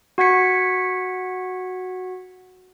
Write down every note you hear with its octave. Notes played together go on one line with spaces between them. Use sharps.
F#4 F#5 G#6 B6 C#7